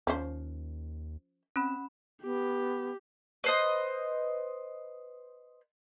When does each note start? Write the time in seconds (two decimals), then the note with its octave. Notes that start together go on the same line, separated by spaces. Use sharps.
0.07 D#2 F3 C#4 C5
1.56 C4 C#4 B5
2.23 B3 G4
3.44 B4 C5 D#5